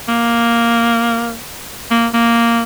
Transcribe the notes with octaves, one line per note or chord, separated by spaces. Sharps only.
A#3
A#3
A#3